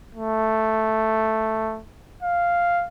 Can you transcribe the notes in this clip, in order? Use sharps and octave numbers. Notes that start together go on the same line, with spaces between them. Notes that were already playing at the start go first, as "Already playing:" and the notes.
A3
F5